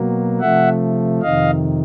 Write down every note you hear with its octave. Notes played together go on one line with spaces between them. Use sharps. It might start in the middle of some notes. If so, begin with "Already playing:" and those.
Already playing: B2 F#3 A#3
C3 F3 A3 E5 F#5
F2 C3 D#3 D#5 F5